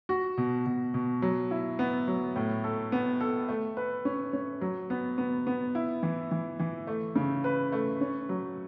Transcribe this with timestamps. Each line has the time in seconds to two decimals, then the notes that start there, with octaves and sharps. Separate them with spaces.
0.09 F#4
0.38 B2
0.66 B2
0.94 B2
1.22 F#3
1.51 E4
1.79 B3
2.08 F#3
2.36 A2
2.64 A4
2.92 B3
3.21 A4
3.49 A3
3.77 B4
4.05 C#4
4.33 C#4
4.61 F#3
4.90 B3
5.18 B3
5.47 B3
5.75 E4
6.03 E3
6.31 E3
6.59 E3
6.87 A3
7.16 C#3
7.44 B4
7.72 A3
8.01 C#4
8.29 F#3